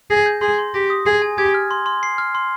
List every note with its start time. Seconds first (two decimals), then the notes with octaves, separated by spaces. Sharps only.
0.10 G#4 A#6
0.26 G6
0.41 G#4 C6
0.59 C6
0.74 G4 A#6
0.90 D#6
1.06 G#4 G#5
1.22 G#5
1.38 G4 G#6
1.54 F6
1.71 C6
1.86 C6
2.03 C7
2.18 F6
2.35 C6